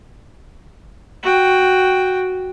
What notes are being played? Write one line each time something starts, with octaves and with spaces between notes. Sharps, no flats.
F#4 G5